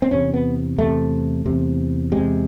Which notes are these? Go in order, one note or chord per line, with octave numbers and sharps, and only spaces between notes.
C4
E2 C3 C#4
B3
E2 C3 A3
E2 C3
C3 G#3
E2